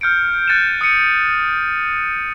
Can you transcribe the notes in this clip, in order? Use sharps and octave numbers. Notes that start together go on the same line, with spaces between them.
F6 G6 C#7 D7
F#6 A6 C#7 D#7 E7
D#6 F#6 C#7 D#7